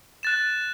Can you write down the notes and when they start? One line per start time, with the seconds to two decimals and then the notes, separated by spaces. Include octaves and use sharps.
0.23 F#6 A6 E7